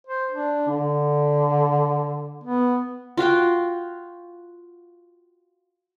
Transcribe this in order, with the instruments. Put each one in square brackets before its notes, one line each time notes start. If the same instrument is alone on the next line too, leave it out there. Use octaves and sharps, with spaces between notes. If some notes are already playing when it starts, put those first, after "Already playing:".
[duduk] C5
D4
D3
B3
[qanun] F4 F#4 F5 G5